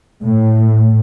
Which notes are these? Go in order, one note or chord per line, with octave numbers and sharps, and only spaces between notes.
A2